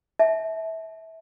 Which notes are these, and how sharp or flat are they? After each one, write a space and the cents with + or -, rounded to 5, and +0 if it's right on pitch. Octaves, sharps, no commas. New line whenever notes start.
E5 -25 A5 -30